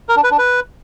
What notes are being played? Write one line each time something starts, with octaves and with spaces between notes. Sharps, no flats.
A#4
D4
B4
D4
B4